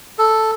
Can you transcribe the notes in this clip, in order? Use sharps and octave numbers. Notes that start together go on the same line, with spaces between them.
A4